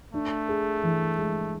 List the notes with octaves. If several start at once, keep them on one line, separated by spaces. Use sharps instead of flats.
A3 D4
G#4
E3
G#3